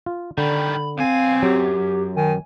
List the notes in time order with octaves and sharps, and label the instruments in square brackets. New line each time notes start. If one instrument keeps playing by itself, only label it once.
[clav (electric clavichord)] F4
[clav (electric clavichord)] D3 [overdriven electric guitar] D#3 G3 [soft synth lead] B5
[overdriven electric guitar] B1 G#5 [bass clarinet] C4 [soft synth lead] F5
[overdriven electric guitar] F#2 [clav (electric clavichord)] F#3 [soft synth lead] G4
[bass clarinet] D#3 [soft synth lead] G#5